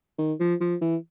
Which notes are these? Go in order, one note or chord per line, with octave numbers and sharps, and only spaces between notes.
D#3
F3
F3
E3